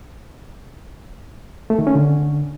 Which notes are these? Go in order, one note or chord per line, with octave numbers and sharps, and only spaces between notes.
A3
D#3
C#4
D3